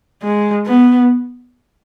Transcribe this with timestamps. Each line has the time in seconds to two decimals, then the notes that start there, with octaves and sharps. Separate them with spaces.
0.22 G#3
0.66 B3